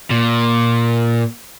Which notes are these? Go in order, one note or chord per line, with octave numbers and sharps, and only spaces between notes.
A#2